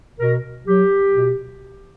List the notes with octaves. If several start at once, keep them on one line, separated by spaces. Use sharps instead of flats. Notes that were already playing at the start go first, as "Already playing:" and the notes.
B2 A#4
F#3 G4
B2